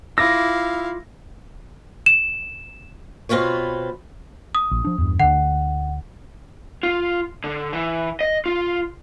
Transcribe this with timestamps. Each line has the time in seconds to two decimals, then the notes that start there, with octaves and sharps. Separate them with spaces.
0.18 E4 F4 F5 D6 E6 A#6
2.06 E7
3.29 B2 C4 F4 B4 C#5
4.55 D#6
4.71 A#1
4.85 F3 D4
4.98 E2 G2
5.20 D2 D3 F#5
6.83 F4
7.44 D3
7.73 E3
8.21 D#5
8.46 F4